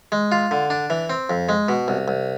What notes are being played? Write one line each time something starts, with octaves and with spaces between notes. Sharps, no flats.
G#3
F4
D3
D4
E3
C4
F2
G#3
B2
C2
C2